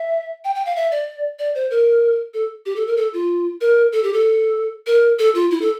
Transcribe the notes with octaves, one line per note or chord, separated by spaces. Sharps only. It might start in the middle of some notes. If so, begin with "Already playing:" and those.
Already playing: E5
G5
G5
F5
E5
D5
D5
C5
A#4
A4
G4
A4
A#4
A4
F4
A#4
A4
G4
A4
A#4
A4
F4
E4
A4